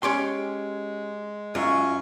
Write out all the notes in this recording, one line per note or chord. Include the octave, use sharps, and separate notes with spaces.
G#3 C#4 G4 C6
F#2 C#4 E4 F4 C#6